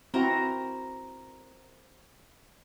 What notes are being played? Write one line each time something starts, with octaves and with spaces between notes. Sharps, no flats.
C4 E4 F#4 A#4 C5 A#5